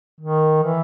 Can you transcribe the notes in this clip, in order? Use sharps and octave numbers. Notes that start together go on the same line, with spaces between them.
D#3
E3